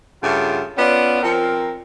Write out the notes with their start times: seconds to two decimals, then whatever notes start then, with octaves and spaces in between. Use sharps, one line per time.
0.22 G2 C#3 A3 F4 F#5
0.78 B3 C#4 F4 D5 F#5
1.22 F3 C4 A#4